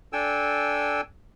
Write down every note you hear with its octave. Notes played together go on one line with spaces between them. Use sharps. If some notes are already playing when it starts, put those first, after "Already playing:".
D4 A4 G5 G#5 E6